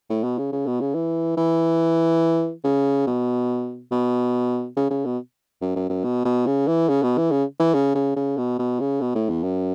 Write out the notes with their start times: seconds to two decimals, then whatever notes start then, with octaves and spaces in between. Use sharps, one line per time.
0.10 A2
0.24 B2
0.38 C#3
0.52 C#3
0.66 B2
0.81 C#3
0.95 E3
1.37 E3
2.64 C#3
3.07 B2
3.91 B2
4.77 C#3
4.91 C#3
5.05 B2
5.61 F#2
5.76 F#2
5.89 F#2
6.04 B2
6.25 B2
6.47 C#3
6.67 E3
6.89 C#3
7.03 B2
7.18 E3
7.31 C#3
7.60 E3
7.74 C#3
7.95 C#3
8.16 C#3
8.37 B2
8.59 B2
8.80 C#3
9.01 B2
9.15 A2
9.29 E2
9.44 F#2